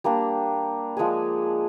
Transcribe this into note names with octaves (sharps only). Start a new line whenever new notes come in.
G3 A#3 D4
F3 G#3 D4 G#4